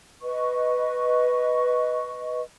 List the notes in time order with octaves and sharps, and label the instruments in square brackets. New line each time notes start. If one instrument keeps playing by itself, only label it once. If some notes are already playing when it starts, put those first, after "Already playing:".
[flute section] B4 D#5 C#6